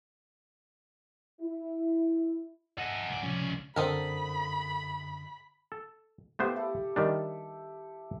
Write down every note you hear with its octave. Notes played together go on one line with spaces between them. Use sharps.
E4
A4 D#5 F#5 G#5
C#2 D5
A2 C3 F3 C#4
F#2 D3 C4 A4 A#4 B5 D#6
A4
A3 B3 E4 G4 C5 F5
E4 A4
D#3 G3 D4